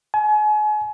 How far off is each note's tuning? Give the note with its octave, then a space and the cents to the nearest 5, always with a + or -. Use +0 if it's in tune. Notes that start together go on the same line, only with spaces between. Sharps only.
G#5 +35